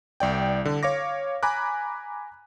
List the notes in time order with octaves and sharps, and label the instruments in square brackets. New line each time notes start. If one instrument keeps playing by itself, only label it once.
[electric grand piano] C2 D5 G5
D3
C#5 F5 D6 A#6
G#5 A#5 B5 D6 F#6